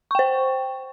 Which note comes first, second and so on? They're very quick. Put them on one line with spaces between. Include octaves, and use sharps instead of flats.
C#6 G5 C5